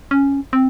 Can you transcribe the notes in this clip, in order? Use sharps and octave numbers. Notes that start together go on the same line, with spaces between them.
C#4
C4